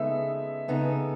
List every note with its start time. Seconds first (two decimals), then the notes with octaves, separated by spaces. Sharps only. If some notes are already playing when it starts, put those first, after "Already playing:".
Already playing: C#3 G#3 B3 D#4 A4 E5
0.68 C#3 G#3 B3 D#4 A4